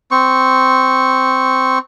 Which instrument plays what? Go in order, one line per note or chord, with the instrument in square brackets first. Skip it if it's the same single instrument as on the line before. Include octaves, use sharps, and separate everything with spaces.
[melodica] C4 C#6